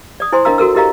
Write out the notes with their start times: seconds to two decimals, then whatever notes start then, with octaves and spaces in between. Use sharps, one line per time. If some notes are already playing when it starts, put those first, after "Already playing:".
0.20 D5 D#6
0.33 E4 C5 G#5 C6
0.45 D4 A#4 D#5 F5 A#5 E6
0.58 F#4 A4 A#4 E6
0.75 E4 G4 A#4 D#5 F5 A#5